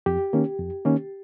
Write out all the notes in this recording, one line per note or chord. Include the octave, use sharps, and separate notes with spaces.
F2 G4
D#3 A#3 C#4
F2
D#3 A#3 C#4